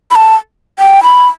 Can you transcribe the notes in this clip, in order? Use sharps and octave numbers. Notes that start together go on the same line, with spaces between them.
B5
A5
G5
B5